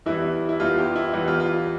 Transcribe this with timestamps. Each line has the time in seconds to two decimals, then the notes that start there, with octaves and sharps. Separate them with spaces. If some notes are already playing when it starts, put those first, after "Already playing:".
0.06 E2 E3 G3 E4
0.49 E4
0.60 E2 E3 G3 F4
0.78 G4
0.96 E4
1.13 E2 E3 G3 E4
1.28 F4
1.40 F4